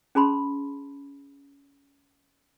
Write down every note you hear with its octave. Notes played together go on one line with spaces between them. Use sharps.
C#4 G#4 A5 B5 C6